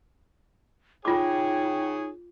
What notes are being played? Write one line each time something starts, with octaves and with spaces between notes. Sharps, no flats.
D#4 F4 G#4 C#5 G5 D6